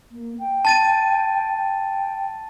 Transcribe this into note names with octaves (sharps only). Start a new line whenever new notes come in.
A#3
G5
A5 A6 D#7
G5